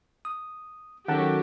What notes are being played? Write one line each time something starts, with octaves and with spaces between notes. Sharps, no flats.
D#6
D#3 F#3 C#4 G4 A4 F#5 A5